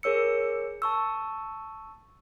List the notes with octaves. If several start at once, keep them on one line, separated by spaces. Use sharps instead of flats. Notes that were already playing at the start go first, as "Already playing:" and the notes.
G#4 A#4 C#5 E6 C#7
A5 C#6 E6